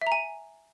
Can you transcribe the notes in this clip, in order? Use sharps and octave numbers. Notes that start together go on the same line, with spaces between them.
E5
A#5
G#5